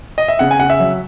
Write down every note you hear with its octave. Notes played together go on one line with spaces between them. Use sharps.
D#5
E5
C#3 F#5
G#5
C#3 F#5
E5
F#3